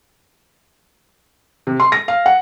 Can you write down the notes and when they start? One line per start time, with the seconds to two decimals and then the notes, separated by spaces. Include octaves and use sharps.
1.67 C3
1.80 C6
1.92 A#6
2.08 F5
2.26 F#5